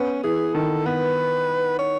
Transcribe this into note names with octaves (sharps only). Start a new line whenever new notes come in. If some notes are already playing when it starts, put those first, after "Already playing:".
Already playing: B3 C#4
E3 G#4
D#3 A4
B3 B4
C#5